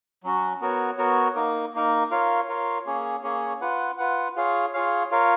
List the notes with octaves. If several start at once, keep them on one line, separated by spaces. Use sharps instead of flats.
F#3 C#4 F#4
B3 F#4 A#4 C#5
B3 F#4 A#4 C#5
A#3 D#4 A#4
A#3 D#4 A#4
F4 A#4 C#5 F5
F4 A#4 C#5 F5
A#3 C#4 G#4 C#5
A#3 C#4 G#4 C#5
F4 B4 F#5
F4 B4 F#5
F4 G#4 C#5 F5
F4 G#4 C#5 F5
F4 A#4 C#5 F5